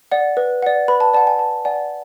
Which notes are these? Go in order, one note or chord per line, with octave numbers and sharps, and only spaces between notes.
D5 F#5
B4
D5 F#5
B4 B5
A5
D5 F#5 A5
G#5
B4 A5
D5 F#5 G#5